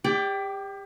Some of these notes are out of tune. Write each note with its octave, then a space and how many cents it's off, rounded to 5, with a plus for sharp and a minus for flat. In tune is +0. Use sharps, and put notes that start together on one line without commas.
G4 +35 D5 +0 G5 -10